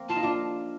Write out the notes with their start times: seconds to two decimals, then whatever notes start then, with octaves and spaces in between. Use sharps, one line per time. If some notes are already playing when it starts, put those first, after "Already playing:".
Already playing: A#3 C4
0.09 F4 A5
0.16 D#4
0.23 D4 F4